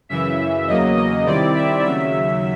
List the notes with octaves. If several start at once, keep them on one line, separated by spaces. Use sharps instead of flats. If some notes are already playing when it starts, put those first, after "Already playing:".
F#2 C#3 E3 E5
E2 C#3 F#3 A#3 D#5
D#5
C3 D#3 G3 C4 E4 D5
E5
D#2 C#3 F#3 E5